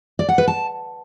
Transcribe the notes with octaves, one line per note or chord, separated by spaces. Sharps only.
D5
F#5
B4
A5